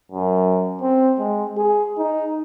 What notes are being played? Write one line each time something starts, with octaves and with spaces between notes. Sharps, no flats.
F#2
C4
G#3
G#4
D#4